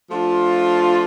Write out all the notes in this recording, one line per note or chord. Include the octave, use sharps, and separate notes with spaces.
F3 A3 D4 F4